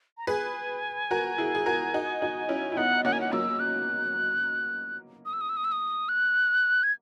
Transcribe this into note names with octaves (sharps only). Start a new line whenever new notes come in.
A#5
G#4 B4 G#5
F#4 A#4
E4 G#4
G#4
F#4 A#4
D#4 F#4
D#4 F#4
C#4 E4
E4
B3 D#4 F#5
A#3 C#4 F#5
G#5
F#5
F#3 A#3 E6
F#6
D#6
E6
D#6
E6
D#6
E6
D#6
F#6
G#6